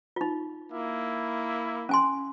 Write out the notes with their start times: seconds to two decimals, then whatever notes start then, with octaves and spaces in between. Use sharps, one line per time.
0.16 D#4 F4
0.71 A#3 E4
1.89 C#4 G#5 C6